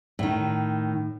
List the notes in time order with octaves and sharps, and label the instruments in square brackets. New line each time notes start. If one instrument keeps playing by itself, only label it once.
[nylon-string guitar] A2 D#3